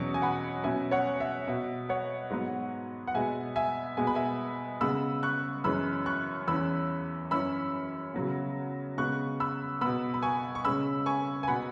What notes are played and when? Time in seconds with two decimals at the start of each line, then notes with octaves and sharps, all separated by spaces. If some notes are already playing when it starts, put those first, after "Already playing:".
Already playing: E2 B2 F#3 C#4 C#6
0.14 G#5
0.22 F#5 B5
0.64 B2 F#3 C#4 E5 G#5
0.91 C#5 F#5
1.20 E5
1.47 B2 B3 E5
1.89 C#5 F#5
2.30 G#2 F#3 B3
3.07 F#5
3.14 B2 G#3 B3 E5 G#5
3.56 E5 G#5
3.97 B2 G#3 B3 G#5
4.07 B5
4.15 E5 G#5
4.81 C#3 G#3 B3 B5 E6
5.23 C#6 F#6
5.64 F#2 E3 G#3 C#4 B5 E6
6.06 C#6 F#6
6.47 E2 E3 C#4 B5 E6
7.31 F#2 E3 C#4 B5 E6
8.14 C#3 F#3 B3
8.98 C#3 G#3 B3 C#6 F#6
9.40 B5 E6
9.81 B2 B3 B5 E6
10.14 B5
10.22 G#5 C#6
10.55 C#6
10.64 C#3 G#3 C#4 B5 E6
11.06 G#5 C#6
11.43 G#5
11.48 B2 B3 F#5 B5